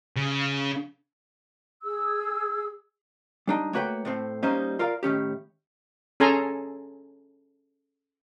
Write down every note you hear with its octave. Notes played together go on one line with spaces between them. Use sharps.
C#3
G#4 E6
G3 D4 D#4
A3 A#3 F#4 B4 C#5 G5
A2 A3 C4
G3 A#3 C#4 D#4 C5 D#5
F4 A#4 D5 F5
A2 D#3 C#4 G4
C#4 G#4 A4 G#5 A#5 C6